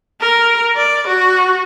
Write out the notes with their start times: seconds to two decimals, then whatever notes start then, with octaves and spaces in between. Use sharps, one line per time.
0.21 A#4
0.76 D5
1.08 F#4